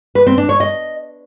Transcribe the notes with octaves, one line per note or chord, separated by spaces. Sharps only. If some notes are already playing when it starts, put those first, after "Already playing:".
B4
C4
D4
C#5
D#5